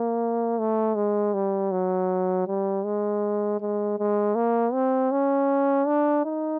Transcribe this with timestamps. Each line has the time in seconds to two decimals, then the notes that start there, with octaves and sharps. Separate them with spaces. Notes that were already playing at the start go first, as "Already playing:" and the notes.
Already playing: A#3
0.59 A3
0.95 G#3
1.34 G3
1.72 F#3
2.47 G3
2.85 G#3
3.60 G#3
3.99 G#3
4.35 A#3
4.73 C4
5.12 C#4
5.87 D4
6.25 D#4